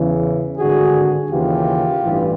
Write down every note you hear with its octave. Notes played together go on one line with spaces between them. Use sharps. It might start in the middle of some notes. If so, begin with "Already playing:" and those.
Already playing: E2 C#3 E3
G#1 G2 D3 F#4 G#4
D#2 C#3 E3 F4 G4
A1 G2 E3